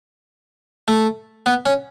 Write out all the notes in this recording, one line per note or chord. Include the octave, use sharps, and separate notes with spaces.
A3
B3
C#4